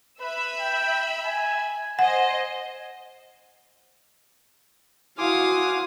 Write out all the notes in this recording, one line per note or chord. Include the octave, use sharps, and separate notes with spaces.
B4 E5 B5 E6
G5
G#5
C5 D#5 F#5 G#5
E4 F#4 F5 G#5 C6 D6 D#6